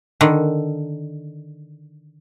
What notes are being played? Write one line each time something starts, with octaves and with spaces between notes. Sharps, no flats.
D3 D#3